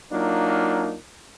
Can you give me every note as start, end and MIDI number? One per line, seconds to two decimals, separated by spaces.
0.12 0.94 54
0.12 0.94 58
0.12 0.94 62
0.12 0.94 63
0.12 0.94 65